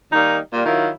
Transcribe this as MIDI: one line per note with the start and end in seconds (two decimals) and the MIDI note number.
0.13 0.37 51
0.13 0.37 55
0.13 0.37 58
0.13 0.37 63
0.53 0.63 46
0.53 0.63 55
0.53 0.63 58
0.65 0.89 51
0.65 0.89 54
0.65 0.89 64
0.65 0.89 65
0.65 0.89 70